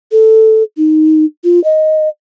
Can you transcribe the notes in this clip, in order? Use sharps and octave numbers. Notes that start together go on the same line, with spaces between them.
A4
D#4
F4
D#5